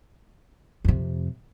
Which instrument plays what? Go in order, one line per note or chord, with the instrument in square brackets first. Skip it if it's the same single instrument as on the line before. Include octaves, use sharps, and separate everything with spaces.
[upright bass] F2 C3